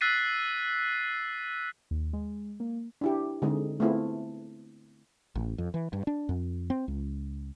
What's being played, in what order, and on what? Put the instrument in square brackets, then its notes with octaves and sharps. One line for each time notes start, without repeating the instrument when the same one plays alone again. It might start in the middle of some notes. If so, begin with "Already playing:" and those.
[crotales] E6 F#6 A6 B6 C7 D#7
[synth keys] D#2
G#3
A#3
[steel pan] D4 E4 G4
D3 G#3 C4 D#4 G#4
A3 B3 C4 E4 F4 G#4
[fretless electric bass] A1
F2
E3
G2
D4
F2
C4
C#2